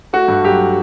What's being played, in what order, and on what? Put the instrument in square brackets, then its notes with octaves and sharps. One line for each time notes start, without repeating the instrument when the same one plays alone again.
[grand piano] A3 F#4
G2
F#3 G4